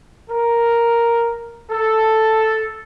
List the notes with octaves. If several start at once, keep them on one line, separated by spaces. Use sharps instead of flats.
A#4
A4